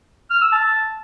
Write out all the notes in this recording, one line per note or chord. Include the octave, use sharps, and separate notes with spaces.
F6
E6
A5